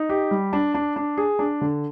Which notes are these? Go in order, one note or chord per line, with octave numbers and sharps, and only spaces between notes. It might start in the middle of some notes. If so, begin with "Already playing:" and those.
Already playing: D#4
G4
G3
D4
D4
D4
G#4
D4
D3